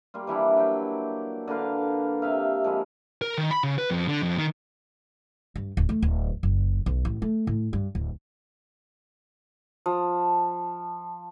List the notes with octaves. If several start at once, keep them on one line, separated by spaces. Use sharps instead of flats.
G3 A#3 F4
E3 G3 D4 E4
F#3 D5 E5 G5
D3 A#3 B4 F5
C3 E5 F5
F3 G#3 A#3 E4
A#4
D#3
B5
C#3
B4
F2
D3
F2
D#3
G2
D1
A3
D1
F#1
B1
A1
A3
A2
G2
D1
F3